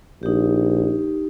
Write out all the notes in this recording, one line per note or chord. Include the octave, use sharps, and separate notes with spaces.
A#1 D#4 G4